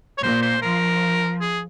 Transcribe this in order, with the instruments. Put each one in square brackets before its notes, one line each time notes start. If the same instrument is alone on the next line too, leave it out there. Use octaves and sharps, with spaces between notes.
[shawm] C#5
[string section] A#2 [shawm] C5
[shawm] C5
[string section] F3 [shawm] A#4
[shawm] G#4